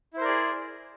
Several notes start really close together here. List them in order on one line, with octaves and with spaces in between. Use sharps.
E4 C5 A#4 D5 G#4